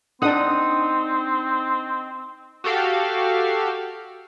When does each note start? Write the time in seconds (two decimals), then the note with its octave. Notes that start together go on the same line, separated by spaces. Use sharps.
0.22 C4 D4 D#4 F#5 D#6
2.64 F#4 G4 A4 F5